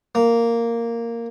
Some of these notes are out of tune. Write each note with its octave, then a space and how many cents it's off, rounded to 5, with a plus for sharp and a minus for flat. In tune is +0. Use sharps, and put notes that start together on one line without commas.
A#3 -5